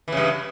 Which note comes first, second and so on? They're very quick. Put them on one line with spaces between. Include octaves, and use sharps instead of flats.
E3 C#3 G2